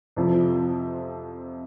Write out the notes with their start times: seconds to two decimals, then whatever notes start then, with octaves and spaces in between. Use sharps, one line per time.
0.16 F2 C3 F3